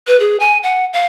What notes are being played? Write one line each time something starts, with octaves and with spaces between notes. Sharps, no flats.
B4
G#4
G#5
F#5
F5